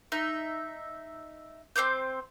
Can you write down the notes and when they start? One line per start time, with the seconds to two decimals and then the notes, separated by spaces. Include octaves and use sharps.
0.12 D#4 E5
1.76 C4 C5 D6 G6